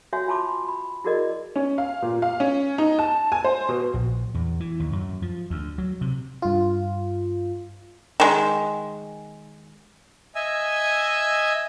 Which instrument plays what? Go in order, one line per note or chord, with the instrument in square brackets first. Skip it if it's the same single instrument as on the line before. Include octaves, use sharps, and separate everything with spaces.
[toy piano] F#4 C#5 E5 G#5
F4 G#5 A5 B5 C6 D6
B5
E4 F#4 G#4 A#4 D5 D#5
[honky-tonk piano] C#4
F5
A#2
F5
C#4
D#4
A5
G#5
C5
B2
[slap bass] A#1
E2
E3
D#2
F#2
F3
D2
F#3
C3
[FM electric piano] G2 F4
[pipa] D#3 G#3
[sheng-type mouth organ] D#5 E5 G#5 E6